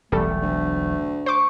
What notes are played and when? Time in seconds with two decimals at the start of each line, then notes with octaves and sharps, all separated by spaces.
0.12 E1 B1 G3 A3 A4
0.42 D2
1.26 C5 C#6 D6